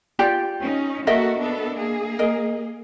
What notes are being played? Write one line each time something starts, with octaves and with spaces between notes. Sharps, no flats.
F4 G4 D5
C#4 D#4
A#3 F#4 A4 A#4 D#5 E5
B3 D4 A4
A#3 G#4
A#4 D#5